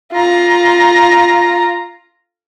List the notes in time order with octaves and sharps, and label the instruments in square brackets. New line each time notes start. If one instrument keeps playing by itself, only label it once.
[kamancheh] F4 A#5